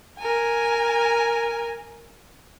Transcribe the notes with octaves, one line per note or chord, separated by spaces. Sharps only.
A#4 G#5